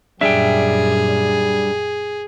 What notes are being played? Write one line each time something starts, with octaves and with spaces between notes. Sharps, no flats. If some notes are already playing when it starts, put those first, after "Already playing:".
F#2 A#2 G3 D4 G#4 E5 G5